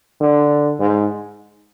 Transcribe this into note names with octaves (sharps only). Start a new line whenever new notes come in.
D3
G#2